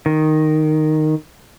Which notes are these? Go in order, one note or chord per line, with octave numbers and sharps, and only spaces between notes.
D#3